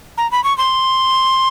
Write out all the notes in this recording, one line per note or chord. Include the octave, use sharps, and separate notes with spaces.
A#5
B5
C#6
C6